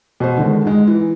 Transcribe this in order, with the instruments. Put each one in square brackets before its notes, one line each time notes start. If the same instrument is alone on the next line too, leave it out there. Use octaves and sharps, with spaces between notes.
[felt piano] B2 C5
D3 D#3 G#3
G#2 G#3
E3